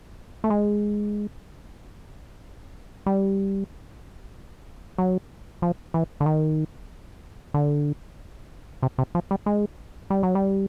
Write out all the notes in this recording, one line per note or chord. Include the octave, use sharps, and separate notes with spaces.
A3
G#3
G3
F#3
F3
E3
D3
D#3
D3
C3
C3
F3
G3
G#3
G3
F#3
G3